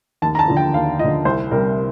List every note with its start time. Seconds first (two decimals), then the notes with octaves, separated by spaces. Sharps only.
0.22 D#2 A5
0.35 A#5
0.39 A5
0.48 D3 F3
0.57 G5
0.74 D#2 F5
0.99 F3 D#5
1.04 D3
1.25 C2 C5
1.51 C3 G3 A#4